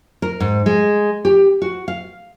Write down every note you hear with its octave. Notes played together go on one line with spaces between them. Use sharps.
A#4
G#2
G#3
G4
F#4
F5